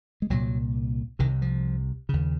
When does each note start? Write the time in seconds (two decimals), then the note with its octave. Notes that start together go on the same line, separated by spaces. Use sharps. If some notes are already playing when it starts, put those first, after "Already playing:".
0.22 G#3
0.30 C2 A#2 F#3
1.19 C2 C3 D#3
1.42 F3
2.09 D#2 C#3